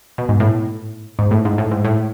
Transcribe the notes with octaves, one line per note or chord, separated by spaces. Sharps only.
B2
G#2
A2
G#2
A2
G#2
A2
G#2
A2